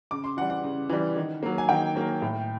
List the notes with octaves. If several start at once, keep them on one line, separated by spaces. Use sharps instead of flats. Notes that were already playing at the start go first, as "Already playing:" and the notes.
C#3 D6
C6
E3 G3 F#5
F#5
C#3
E3 G3
D#3
F#3 A#3
G#5
D#3 G5
F#3 A#3
A2